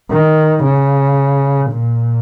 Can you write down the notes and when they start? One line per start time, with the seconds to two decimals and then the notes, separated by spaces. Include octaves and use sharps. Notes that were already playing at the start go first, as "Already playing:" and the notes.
0.11 D#3
0.64 C#3
1.72 A#2